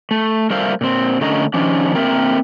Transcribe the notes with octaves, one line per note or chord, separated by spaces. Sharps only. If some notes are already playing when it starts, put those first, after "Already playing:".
A3
G3 A3 A#4 C5 E5 F5
A#2 C4
D3 A3 C#4 A#4 D#5
D#3 F3 C#4 D4
A#3 C4 A#4 E5